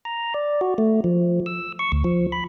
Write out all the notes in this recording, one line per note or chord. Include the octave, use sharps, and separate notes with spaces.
A#5
D5
F#4
A3
F3
E6
C#6
D2
F3
B5